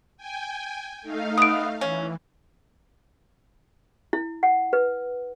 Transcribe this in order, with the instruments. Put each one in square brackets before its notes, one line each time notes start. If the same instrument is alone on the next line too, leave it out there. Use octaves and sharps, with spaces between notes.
[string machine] G5 G#5
A3 D#4 F5
[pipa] B3 [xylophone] D#6 D7
[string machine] E3 [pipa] C#4
[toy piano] E4
F#5
B4